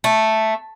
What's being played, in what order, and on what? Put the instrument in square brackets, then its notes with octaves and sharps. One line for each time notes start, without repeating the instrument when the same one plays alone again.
[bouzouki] A3